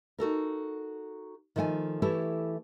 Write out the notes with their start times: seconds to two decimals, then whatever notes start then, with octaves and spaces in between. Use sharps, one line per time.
0.18 D#4 F#4 A4 A#4
1.56 D#3 F3 A3 F#5 G#5
2.02 E3 A3 E4 G4 A4 C#5